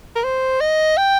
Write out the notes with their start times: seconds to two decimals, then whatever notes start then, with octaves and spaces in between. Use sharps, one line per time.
0.16 A#4
0.24 C5
0.61 D#5
0.97 G5